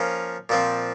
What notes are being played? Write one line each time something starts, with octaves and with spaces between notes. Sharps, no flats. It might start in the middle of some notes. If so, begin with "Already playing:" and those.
Already playing: F3 A#3 C#4 F4
A#2 F3 C4